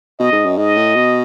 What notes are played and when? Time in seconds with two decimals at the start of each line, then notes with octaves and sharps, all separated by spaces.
0.20 B2 D#5
0.32 G#2
0.46 F#2
0.58 G#2 D#5
0.76 A2
0.95 B2